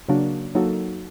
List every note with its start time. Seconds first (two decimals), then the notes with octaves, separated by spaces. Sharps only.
0.09 C#3 F#3 A#3 D4 F#4
0.55 F#3 A#3 D#4 F#4 A4